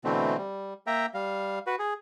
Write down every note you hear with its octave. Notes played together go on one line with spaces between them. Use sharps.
B2 D3 E3 A3 C4
G3
A#3 E5 G5 A#5
G3 F5
F#4 B4
G#4